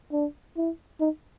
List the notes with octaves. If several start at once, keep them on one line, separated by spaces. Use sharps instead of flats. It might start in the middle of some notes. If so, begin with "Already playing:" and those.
D4
E4
D#4